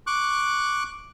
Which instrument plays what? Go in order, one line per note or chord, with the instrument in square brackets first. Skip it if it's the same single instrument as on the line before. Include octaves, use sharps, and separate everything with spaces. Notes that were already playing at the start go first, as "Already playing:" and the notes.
[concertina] C#6 D6 F#6